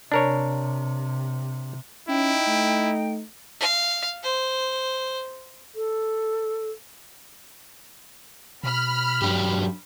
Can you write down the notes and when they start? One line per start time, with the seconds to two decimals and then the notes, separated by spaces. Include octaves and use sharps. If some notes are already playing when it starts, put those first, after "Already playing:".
0.12 C3 D4 A#4 C#5
2.09 C#4 D#4 E4 G5
2.47 A3
3.60 F5
4.24 C5
5.75 A4
8.64 B2 B5 F6
9.22 G2 F#3 D4 G4